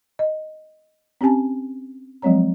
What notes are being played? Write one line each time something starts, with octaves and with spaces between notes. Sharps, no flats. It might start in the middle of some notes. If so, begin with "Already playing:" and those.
D#5
C4 C#4 G4 G#5 A5
F3 F#3 G#3 C4 C#5 A#5